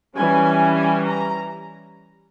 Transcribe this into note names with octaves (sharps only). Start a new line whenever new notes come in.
E3 G3 C#4 G#5
G#5
A#5